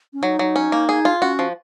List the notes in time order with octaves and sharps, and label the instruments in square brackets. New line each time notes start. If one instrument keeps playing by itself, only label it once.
[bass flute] C#4
[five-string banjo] F#3 [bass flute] D#4
[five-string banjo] F#3
C#4
A#3
G#4
F4
[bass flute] C#4 [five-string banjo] F#4
[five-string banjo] F3